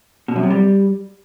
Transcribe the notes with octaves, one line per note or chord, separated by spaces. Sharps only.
B2
F#2
C3
G3